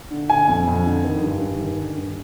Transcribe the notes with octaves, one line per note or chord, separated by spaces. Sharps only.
D3
D3 G#5
F2
F2
D3
D#3
G2
G2
D#3
D3
G2